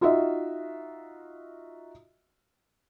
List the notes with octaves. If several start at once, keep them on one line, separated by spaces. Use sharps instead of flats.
D#4 F4 F#4 D#5 E5